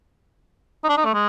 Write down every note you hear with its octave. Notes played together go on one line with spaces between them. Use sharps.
D#4
D4
D#4
A3
G#3